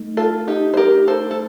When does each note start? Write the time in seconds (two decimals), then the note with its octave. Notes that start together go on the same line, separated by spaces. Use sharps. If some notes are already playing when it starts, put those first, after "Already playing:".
Already playing: A3 D#4
0.17 F4 A4
0.48 D#4 G4
0.73 C5
0.77 G4 A#4
1.08 A4 C5
1.31 A4